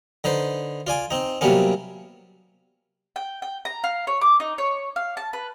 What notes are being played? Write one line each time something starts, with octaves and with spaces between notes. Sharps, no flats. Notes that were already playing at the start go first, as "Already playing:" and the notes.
D3 D#4 B4 C5
F4 D5 G#5 D6
C4 D#4
C3 F#3 G3 A#3 B3 C#4
G5
G5
A#5
F5
C#5
D6
D#4
C#5
F5
A5
B4